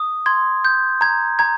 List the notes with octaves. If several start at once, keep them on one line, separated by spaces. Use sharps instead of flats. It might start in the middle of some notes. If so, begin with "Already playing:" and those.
Already playing: D#6
C6 G#6
G6
A#5 G#6
A#5 G#6